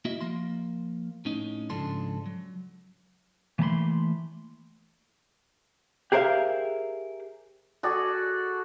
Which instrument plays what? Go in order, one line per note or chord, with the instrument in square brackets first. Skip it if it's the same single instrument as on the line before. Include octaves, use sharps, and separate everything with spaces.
[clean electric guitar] A#3 E4 F#4 D#5 E5
F3 A#3 C6
A2 C#4 D#4
G#2 C#3 F3 D4 A4 C6
F#3
E3 A3 A#3 A5 B5 C6
[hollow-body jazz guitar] G4 G#4 A#4 C5 E5 F5
[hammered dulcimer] F#4 G#4 A4 D5